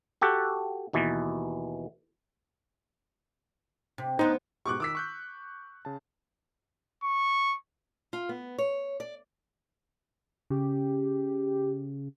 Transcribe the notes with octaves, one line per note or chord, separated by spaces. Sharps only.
F#4 G4 A4 F#5
D#2 B2 E3
C3
D2 B3 D#4 C5
G#2 B2 G4 C#6 D6 F#6
D#3 D6 E6 B6
C#6 F#6 G6
C#3 A5
C#6
F4
B3
C#5
D5
C#3 G4